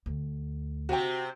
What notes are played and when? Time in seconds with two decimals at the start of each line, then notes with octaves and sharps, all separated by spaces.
0.06 D2
0.89 C3 C4 F#4 G5